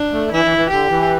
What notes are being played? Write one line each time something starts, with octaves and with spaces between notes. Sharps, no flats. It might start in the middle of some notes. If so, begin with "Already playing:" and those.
Already playing: D4
A3
E3 E4
E3
E3
D3 G4
E3